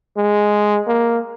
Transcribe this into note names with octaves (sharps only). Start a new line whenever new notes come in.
G#3
A#3